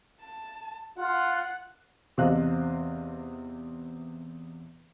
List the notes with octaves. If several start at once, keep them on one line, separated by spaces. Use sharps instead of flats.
A5
F4 F#5 F#6
E2 C3 C5 D#5 F5 F#6